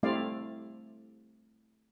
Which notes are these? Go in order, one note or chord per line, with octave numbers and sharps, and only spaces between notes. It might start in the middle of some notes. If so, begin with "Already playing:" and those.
G3 A3 C4 E4 D5 F5